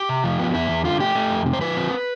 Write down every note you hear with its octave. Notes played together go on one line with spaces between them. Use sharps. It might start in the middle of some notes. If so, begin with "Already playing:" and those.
Already playing: G4
C3
F3
B3
E2 E4
E2
D3 F4
A3 G4
A3
F2
C3
C5
F3 B4
C4